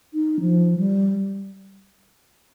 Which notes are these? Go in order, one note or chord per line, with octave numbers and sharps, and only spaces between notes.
D#4
F3
G3